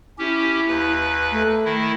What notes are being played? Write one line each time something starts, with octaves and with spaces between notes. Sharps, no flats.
C#4 E4 G4
D#2 B4
A3
D#3 E4